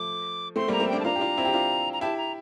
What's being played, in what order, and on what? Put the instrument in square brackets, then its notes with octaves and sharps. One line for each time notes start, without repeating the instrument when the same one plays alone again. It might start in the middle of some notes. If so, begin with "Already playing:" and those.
Already playing: [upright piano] F3 A3 [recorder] D6
[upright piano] A3 C4 [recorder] C6
[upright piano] G3 A#3 [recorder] A#5
[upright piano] A3 C4
[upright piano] A#3 D4 [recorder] G5
[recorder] A5
[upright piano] D4 F4 [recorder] A#5
[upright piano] G4
D4 F4
C4 E4
G4
D4 F4
[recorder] A#5
[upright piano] E4 G4 [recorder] A5
[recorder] A#5